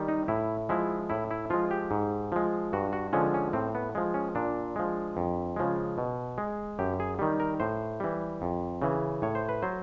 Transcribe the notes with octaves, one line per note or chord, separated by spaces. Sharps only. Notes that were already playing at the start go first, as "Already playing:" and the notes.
Already playing: D#3 G3
D#4
A2 E4
F3 G#3 E4
A2 E4
E4
F3 G#3 F4
G4
G#2
F3 G#3
G2 F#4
F#4
D3 F3 G#3 C#4
C#4
A2 C4
B3
F3 G#3
C#4
A#2 D4
F3 G#3
F2
C#3 F3 G#3
B2
G#3
F#2 G4
G#4
D#3 G3
A#4
A2 C5
E3 G3
F2
C#3 E3
A2 C#5
C5
B4
F#3 C5